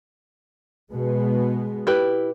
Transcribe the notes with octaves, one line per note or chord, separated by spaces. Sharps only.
B2 G#3 B3
E4 G4 B4